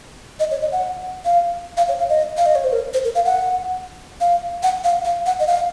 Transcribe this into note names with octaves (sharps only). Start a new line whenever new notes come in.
D#5
C#5
D#5
F#5
F5
F5
C#5
F5
D#5
F5
D#5
C#5
C5
A#4
C5
A#4
F5
F#5
F5
F#5
F5
F5
F#5
D#5
F5